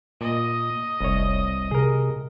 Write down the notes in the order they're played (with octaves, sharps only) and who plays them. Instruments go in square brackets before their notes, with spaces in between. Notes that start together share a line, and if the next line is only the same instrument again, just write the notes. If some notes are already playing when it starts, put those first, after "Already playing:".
[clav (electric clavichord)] A#2 [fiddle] D#5
[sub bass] F1 [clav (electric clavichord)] C2 C#5
[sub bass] C3 [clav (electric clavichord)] G#4 A#4